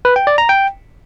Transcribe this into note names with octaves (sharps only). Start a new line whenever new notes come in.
B4
G5
D5
A#5
G5